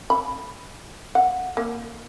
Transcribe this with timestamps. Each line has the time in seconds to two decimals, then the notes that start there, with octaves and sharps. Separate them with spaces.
0.10 B5
1.15 F#5
1.57 A#3